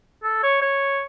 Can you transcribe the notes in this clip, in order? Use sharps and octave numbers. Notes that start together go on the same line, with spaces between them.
A4
C#5
C#5